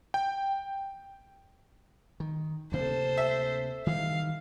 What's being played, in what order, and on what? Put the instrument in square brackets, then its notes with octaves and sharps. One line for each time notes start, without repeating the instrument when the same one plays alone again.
[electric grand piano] G5
[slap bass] D#3
[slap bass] D2 C3 A#3 [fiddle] A4 C5
[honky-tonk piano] E5
[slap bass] D#3 E3 G3 [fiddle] F5